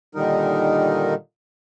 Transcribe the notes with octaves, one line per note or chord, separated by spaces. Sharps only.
A#2 D3 D#3 G3 D#4 A#4